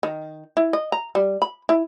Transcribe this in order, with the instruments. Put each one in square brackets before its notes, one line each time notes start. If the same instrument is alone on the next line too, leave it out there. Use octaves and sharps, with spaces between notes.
[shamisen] D#3
E4
D#5
A#5
G3
B5
E4